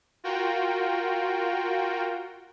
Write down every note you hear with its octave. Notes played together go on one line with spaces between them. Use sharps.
F4 F#4 A#4 G5